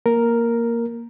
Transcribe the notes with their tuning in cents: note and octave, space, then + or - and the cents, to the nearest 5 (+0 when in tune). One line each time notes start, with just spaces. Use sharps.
A#3 +0 A#4 +0